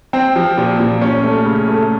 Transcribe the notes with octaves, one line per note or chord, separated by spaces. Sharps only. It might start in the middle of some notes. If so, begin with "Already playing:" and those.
C4
F3
A#2
A#2
C#4
A3
C#3
A3